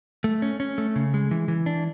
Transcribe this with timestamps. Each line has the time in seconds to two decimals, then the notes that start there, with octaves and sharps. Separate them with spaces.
0.24 A3
0.42 C#4
0.60 C#4
0.78 A3
0.96 C#3
1.14 G#3
1.31 E3
1.48 E3
1.66 D4